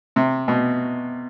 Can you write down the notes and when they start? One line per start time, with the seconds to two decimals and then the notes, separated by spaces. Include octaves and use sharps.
0.16 C3
0.48 B2